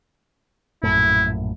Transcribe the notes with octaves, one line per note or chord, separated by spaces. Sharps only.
A#1 F#2 A2 E4